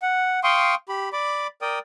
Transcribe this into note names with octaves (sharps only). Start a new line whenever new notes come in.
F#5
F5 G5 C6 C#6 D#6
G4 B5
D5 B5 D6
A#4 D5 G5 D#6